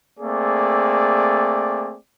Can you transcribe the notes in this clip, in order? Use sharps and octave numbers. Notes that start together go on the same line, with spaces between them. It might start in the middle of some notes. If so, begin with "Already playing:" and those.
A3 A#3 C4 G#4 D5